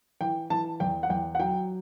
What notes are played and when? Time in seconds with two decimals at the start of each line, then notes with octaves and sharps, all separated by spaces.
0.21 E3 G5
0.50 E3 A5
0.80 E2 G5
1.03 F#5
1.10 E2 G5
1.35 F#5
1.39 F#3 G5